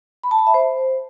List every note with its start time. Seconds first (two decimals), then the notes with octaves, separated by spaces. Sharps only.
0.23 B5
0.31 A5
0.39 B5
0.47 E5
0.54 C5